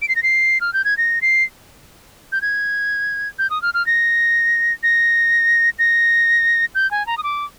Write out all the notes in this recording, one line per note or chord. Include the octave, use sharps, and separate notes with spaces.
D7
C7
A#6
C7
F6
G6
G#6
A#6
C7
G6
G#6
G6
D#6
F6
F6
A#6
A#6
A#6
G6
G#5
A#5
D#6
D6